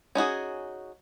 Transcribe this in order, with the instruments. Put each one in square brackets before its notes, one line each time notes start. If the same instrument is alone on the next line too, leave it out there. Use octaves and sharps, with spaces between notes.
[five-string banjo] C#4 D#4 F#4 G#4